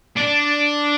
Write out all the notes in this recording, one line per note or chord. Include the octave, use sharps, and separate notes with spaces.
D4